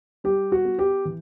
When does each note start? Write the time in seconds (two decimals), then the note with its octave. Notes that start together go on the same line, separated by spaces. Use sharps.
0.24 G3 G4
0.52 F#4
0.65 B3
0.79 G4
1.05 E3